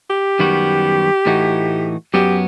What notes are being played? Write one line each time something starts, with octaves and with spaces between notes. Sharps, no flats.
G4
F#2 D#3 G3 B3 F#4
A2 E3 A3 D#4 F#4
F#2 F#3 B3 F#4 G4